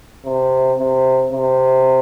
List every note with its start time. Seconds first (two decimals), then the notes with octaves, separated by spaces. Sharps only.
0.25 C3
0.79 C3
1.32 C3